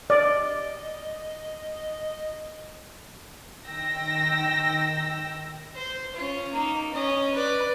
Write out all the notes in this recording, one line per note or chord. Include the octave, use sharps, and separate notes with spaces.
D5 D#5
D#3 G5 E6 A#6
C5 C6
C#4 F4
A#3 D#4
C#4 D#5
B4 D5